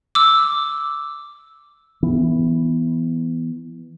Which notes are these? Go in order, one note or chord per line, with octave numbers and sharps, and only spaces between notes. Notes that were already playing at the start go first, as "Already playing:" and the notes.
D6 E6
E3 B3